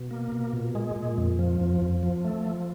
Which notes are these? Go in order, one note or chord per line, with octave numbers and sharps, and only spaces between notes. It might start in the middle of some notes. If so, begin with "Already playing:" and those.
Already playing: B2
A#3
B2
A#2
G#3
A#2
F2
F3
F2
F2
F3
A3
F3